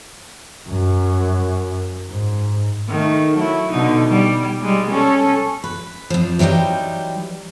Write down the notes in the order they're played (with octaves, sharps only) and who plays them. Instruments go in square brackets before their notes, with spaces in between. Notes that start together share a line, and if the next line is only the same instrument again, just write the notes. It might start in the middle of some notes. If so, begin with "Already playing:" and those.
[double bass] F#2
G#2
[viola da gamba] D#3 A3
F#3 E4
B2 D3 D#4
G3
G3 G#3
C#4 A4
[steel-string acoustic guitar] B4
F2 F3
E3 F#3 G3 D#4 G5